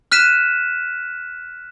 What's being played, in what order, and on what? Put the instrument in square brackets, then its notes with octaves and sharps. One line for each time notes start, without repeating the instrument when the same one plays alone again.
[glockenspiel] F6 F#6 B6 D#7 E7